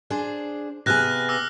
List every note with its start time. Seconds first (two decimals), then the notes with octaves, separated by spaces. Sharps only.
0.10 D4 G#4 C5
0.86 C3 B3 G#4 F6 F#6 A#6
1.29 D6 E6 A#6